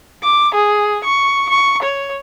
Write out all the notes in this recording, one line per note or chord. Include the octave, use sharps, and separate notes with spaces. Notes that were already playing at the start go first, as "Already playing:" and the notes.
D6
G#4
C#6
C#6
C#5